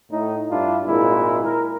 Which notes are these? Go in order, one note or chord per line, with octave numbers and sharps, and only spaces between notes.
A2 D#4
G2 D4 E4 F4
G#1 A#2 G#3 E4
A#4